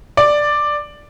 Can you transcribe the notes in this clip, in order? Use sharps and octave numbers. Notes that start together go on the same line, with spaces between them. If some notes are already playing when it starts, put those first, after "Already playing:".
D5